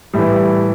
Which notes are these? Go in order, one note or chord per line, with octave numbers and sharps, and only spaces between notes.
A2 E3 G3